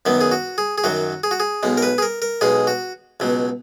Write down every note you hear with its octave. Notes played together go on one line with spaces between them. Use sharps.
F#2 D#3 F#3 B3
G#4
F#4
G#4
G#4
F#2 D#3 F#3 F#4
G#4
F#4
G#4
B1 B2 G#3
A#4
B4
G#4
A#4
A#4
B1 B2 G#3 G#4
F#4
C#2 B2 F#3